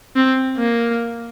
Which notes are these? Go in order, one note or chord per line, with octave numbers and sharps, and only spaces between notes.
C4
A#3